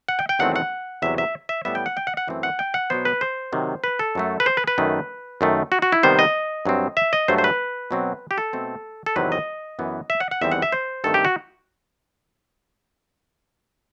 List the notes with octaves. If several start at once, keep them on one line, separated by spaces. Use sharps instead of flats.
F#5
G5
G5
E2 D#3 F#3 A3 C4 F#5
F#5
E2 C3 F#3 E5
E5
E5
A2 G3 B3 E5
G5
F#5
G5
F#5
F#5
F#2 E3 A3 C4
F#5
G5
F#5
B2 F#3 B3 C5
B4
C5
C3 D#3 F#3
B4
A4
F#2 F#3 A3
B4
C5
B4
B4
F#2 D#3 A3
F#2 D#3 A3
F#4
F#4
E4
C3 D#3 G3 B3 C5
D#5
G2 F#3 C4
E5
D#5
G2 F#3 A3 C5
C5
B4
B2 F#3 C4
G4
A4
B2 A3 C4
A4
E2 C3 D#3 F#3 C4 B4
D#5
F#2 E3 B3
E5
F#5
F#5
E2 D#3 G3 C4 E5
F#5
E5
C5
G2 D#3 A3 C4 A4
G4
F#4